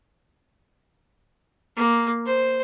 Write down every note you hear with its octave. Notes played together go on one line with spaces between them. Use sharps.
A#3
C5